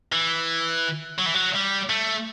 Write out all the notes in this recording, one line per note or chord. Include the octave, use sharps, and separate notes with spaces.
E3
F#3
E3
F#3
G3
A3